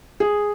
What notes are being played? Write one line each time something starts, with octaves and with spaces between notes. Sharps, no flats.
G#4